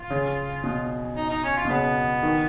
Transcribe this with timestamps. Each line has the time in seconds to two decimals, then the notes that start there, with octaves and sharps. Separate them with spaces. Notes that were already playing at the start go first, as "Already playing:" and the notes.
Already playing: F4
0.10 C#3
0.64 B2
1.16 D#4
1.30 D#4
1.44 C#4
1.57 F4
1.65 B2
1.70 C#3 B3
2.23 D#3